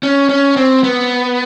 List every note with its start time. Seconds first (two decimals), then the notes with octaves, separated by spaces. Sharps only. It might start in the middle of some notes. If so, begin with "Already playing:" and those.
0.03 C#4
0.29 C#4
0.57 C4
0.83 B3